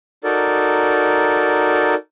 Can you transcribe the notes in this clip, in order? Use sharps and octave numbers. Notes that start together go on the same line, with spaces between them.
D#4 F#4 A4 A#4 D5